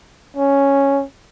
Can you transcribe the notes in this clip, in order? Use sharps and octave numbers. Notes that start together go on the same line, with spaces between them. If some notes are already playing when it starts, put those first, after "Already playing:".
C#4